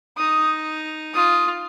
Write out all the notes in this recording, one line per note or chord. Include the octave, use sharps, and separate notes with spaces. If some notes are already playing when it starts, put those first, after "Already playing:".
D#4 D#6
F4 D#6